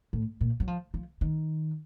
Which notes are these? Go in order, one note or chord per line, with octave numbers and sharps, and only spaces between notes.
A2
A#2
F#3
F3
F3
D#3